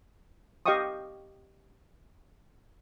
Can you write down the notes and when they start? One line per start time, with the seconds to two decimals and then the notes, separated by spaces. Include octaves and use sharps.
0.66 G4 D#5 F5 G5 C#6 D#6